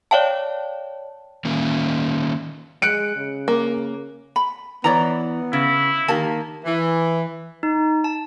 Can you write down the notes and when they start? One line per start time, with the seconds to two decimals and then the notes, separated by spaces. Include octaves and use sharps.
0.11 C#5 D5 F5 G5 A5
1.45 D#3 A#3 C#4
2.82 G#3 F#6 C#7 D7
3.16 C#3
3.48 A#3
4.36 B5
4.84 E3 B3 E4 C#5 D5 A#5
5.53 C#3 E4
6.08 D#3 A#3 G4 A5
6.66 E3
7.63 D#4
8.04 A5